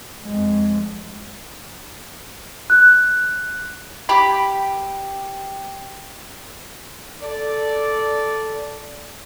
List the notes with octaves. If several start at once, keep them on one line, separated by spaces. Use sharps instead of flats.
F2 G#3
F#6
G4 B5
A4 D5